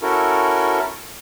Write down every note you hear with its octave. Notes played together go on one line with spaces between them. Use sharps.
C#4 E4 F#4 A4 A#4